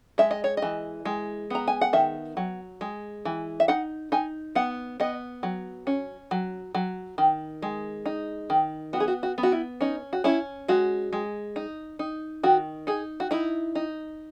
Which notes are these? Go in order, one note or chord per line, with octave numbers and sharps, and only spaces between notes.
G#3 E5
D#5
C#5
D#5
E3
G#3
B3 A#5
G#5
F#5
D#3 E5
F#3
G#3
E3
E5
D#4 F#5
D#4 G#5
B3 F#5
B3 D#5
F#3
C#4
F#3
F#3
D#3
G#3
D#4
D#3
B3 F#4
G#4
F#4
F#4
B3
F#4
E4
C#4 D#4
F#4
C#4 E4
G#3 F#4
G#3
D#4
D#4
D#3 F#4
D#4 G#4
F#4
D#4 E4
D#4